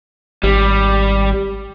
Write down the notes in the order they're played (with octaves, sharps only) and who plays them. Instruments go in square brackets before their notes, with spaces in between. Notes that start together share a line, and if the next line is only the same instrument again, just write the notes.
[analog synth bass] G#1 [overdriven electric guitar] G3